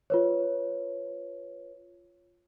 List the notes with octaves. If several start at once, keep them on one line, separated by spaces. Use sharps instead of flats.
F4 B4 C#5